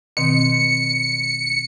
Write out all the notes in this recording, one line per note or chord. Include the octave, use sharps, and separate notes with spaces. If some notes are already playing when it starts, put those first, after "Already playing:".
B2 D#3 C4 C#7